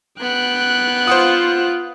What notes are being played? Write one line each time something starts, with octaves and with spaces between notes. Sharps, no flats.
B3 G5 F#6
F4 C5 F#5 D#6